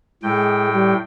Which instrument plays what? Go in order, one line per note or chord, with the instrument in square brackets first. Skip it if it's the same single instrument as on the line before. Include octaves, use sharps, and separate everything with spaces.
[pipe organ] A2 G5 [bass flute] G#3
[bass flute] G3